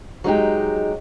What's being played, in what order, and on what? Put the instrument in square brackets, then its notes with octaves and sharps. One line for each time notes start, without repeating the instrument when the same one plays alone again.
[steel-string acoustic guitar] F#3 G#3 D#4 G4